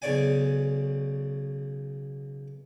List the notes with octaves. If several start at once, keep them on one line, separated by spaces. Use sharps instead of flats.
B1 C#3 C#5 D5 G#5